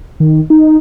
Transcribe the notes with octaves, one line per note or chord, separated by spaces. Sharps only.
D#3
D#4